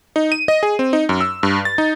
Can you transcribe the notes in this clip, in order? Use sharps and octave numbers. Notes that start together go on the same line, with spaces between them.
D#4
D#7
D#5
G#4
C4
D#4
F#2
E6
G2
A6
D#4